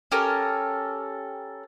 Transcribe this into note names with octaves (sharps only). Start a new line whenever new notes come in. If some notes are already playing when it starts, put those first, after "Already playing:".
C#4 G4 A4 A#4